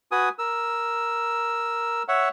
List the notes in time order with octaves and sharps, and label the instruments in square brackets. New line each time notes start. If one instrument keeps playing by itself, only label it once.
[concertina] F#4 B4 G#5 D#6
A#4 E6
C#5 E5 F#5